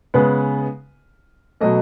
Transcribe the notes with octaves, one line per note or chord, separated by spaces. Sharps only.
C#3 G#3 B3 B4
B2 F#3 A3 D#5